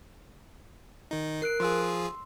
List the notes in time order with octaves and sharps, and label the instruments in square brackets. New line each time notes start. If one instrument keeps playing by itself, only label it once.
[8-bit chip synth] D#3 D#4
[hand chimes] A#4 F#6 D7 [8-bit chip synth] C7
[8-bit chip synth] F3 F4 G#4 [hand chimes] C6 E6